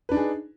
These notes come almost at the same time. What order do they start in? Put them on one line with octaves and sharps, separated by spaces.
B4 D4 D#4 G#4